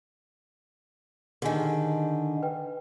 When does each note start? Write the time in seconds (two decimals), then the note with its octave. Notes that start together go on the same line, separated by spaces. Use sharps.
1.42 D3 D#3 G4 G#4 G#5
2.43 B4 G5